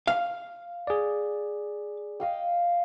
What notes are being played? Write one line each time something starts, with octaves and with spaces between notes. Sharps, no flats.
F5
G#4 D5
D#5 F5 G5